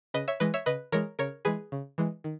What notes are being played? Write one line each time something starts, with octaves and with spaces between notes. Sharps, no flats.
C#3 B4 D#5
C#5 E5
E3 G#3 B4 D#5
C#5 E5
C#3 B4 D#5
E3 G#3 A#4 C#5
C#3 A#4 C#5
E3 G#3 G#4 B4
C#3
E3 G#3
D#3